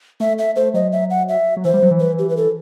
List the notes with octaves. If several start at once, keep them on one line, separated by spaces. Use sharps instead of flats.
A3 E5
E5
A3 C5
F#3 D#5
E5
F#5
E5
F#3
E3 C5
G3
F#3
E3
B4
G4
B4
A4